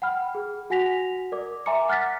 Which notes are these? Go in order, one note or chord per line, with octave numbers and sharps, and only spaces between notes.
F#5 G5 B5 F6
G#4
F#4 F#5 G#5 A#6 B6 F7
A#4 D5 D6
E5 G#5 A#5 C6 D6 C#7
F#5 F6 F#6 A6 B6